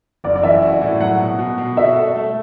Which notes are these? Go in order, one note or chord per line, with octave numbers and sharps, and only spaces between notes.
F#1 D5
D5
E3 E5
F#4
A2
F#3 F#5
B2
B2
B2
F#4 E5
A4
A3